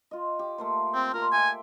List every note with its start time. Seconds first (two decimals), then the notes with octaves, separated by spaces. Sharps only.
0.11 F4 D#5
0.39 G4
0.58 A3 A#3 C5
0.94 C4
1.14 F4 A#4 C6
1.32 E5 G5 G#5